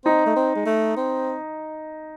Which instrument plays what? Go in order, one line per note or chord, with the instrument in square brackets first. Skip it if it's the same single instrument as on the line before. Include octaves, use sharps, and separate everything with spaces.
[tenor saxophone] C4 [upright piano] D#4
[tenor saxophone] A3
C4
G#3
A3
C4